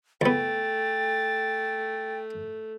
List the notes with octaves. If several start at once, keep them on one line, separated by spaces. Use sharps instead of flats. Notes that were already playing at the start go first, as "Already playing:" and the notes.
C#2 A3 B3 G5 A6